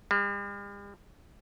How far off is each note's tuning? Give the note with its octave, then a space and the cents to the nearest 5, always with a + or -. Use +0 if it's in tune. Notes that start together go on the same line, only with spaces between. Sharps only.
G3 +45